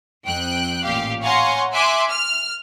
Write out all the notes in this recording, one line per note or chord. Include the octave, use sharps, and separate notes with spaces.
F2 G5 F#6
A1 A#2 G4 F5
C#5 F5 F#5 G#5 A#5 C6
E5 G#5 C6 D6 F#6
F6